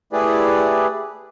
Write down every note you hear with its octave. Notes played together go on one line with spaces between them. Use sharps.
A3 E4 G4 G#4 B4 D5